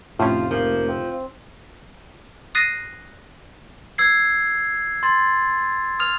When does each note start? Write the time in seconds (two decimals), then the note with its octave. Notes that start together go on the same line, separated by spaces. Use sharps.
0.20 F1 A2 F3 C#4 F4
0.51 F3 A#3
0.89 C4
2.55 D#6 F#6 A6 A#6 C7 D#7
3.98 E6 G#6 C7
5.03 C6 A6
5.99 D#6 F6 F7